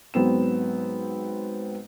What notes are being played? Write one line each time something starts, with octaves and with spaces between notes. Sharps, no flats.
G#2 F#3 B3 C4 E7